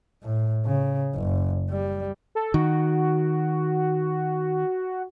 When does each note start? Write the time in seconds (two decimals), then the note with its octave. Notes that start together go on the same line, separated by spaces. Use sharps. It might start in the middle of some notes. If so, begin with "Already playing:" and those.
0.23 A2
0.65 C#3
1.15 F#1
1.70 G3
2.35 A4
2.54 D#3 F#4